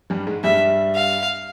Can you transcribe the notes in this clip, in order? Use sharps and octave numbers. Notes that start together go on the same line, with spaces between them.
G2 G3
G#2 G#3
G2 G3 E5
F5